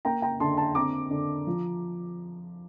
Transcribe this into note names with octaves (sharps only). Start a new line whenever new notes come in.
A#3 G5 A#5
G5 A#5
D3 A5 C6
A5 C6
C4 A#5 D6
D3
F3